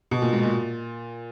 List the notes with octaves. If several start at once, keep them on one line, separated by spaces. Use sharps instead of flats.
B2
A#2
G#2
A#2